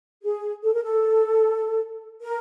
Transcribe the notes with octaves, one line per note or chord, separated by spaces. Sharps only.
G#4
A4
A#4
A4
A#4